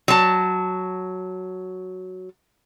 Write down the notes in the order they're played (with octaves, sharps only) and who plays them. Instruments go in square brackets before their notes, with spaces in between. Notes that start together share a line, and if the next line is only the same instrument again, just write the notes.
[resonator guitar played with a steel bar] F#3 A5